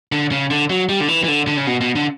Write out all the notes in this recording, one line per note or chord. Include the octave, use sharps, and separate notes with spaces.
D3
C#3
D3
F#3
G3
D3
E3
E3
D3
D3
C#3
B2
B2
D3